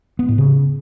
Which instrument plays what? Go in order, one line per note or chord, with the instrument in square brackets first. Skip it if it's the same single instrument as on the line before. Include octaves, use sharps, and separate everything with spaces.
[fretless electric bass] B3
A2
C#3